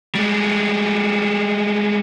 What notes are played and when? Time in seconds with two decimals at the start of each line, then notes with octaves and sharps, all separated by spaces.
0.15 G3 G#3